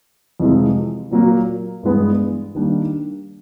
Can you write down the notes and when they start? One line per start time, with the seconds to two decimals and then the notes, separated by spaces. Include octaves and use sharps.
0.40 F2 C3 E3 G#3
1.11 A#2 F#3 A#3
1.83 G2 E3 G#3 B3
2.55 D#3 G3 A#3 D4